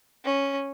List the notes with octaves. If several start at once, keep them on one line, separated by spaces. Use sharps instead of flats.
C#4